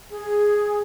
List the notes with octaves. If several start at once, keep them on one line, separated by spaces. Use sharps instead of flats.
G#4